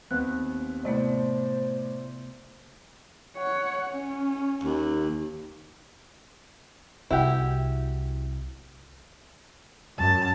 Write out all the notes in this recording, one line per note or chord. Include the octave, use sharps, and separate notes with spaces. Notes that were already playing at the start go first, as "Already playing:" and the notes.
D#2 B3 C4 F#6
A2 C3 A3 B3 C5 D5
C#5 F#5
C#4
D#2
C2 E4 F#4 G4
F#2 A5